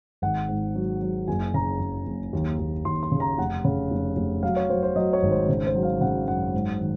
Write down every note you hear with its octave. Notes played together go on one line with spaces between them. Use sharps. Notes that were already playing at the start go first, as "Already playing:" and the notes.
G#1 F#5
G#2
F#3
F#3
F#1 G#5
C#3 A#5
F#1
F#1
D#2
D#2
D#2 C6
C6
C#3
A#5
F1 F#5
C#3
F1
F1
F#3 F5
C#5
F#3 C5
C5
F#3 D#5
C#5
G#1
C5
C#3 C5
C5
F#3
F5
C#3 F#5
F#2 F#5
G#2
D#3